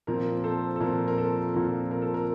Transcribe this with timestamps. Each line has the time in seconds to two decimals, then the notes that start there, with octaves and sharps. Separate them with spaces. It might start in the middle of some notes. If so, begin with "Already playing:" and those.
0.07 A#2 F3 C4 A#4
0.44 A4 C5
0.76 A4
0.81 A#2 F3 C4 A#4
1.08 A#4
1.18 A4
1.54 A#2 F3 C4 A#4
1.91 A#4
2.02 A4
2.14 A#4